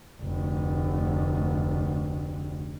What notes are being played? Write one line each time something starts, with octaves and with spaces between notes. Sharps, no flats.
F1 D2